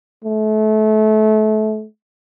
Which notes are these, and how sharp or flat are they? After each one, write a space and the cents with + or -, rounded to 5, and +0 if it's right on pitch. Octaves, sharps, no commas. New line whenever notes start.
A3 -30